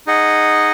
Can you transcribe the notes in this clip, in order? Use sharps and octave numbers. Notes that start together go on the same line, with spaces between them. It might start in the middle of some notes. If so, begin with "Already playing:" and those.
D#4 G#4 D#5 F#5